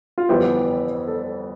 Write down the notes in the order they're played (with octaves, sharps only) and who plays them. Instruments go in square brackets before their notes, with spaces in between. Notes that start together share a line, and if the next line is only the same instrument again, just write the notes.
[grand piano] F4
[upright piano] G1 F2 E3 B3 E4 [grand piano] G4
[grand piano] A4